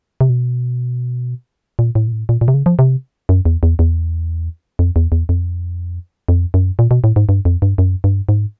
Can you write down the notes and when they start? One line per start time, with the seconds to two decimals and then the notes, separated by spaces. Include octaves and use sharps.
0.21 C3
0.29 B2
1.79 A#2
1.95 A2
2.07 A#2
2.12 A2
2.29 A#2
2.41 A#2
2.48 C3
2.54 C#3
2.66 F3
2.79 C3
3.29 F#2
3.45 E2
3.63 E2
3.79 E2
4.79 F2
4.96 E2
5.12 E2
5.29 F2
6.28 F2
6.54 F#2
6.79 A#2
6.91 B2
7.04 A2
7.16 G#2
7.29 G2
7.45 F2
7.62 G2
7.78 F#2
8.04 G2
8.29 G#2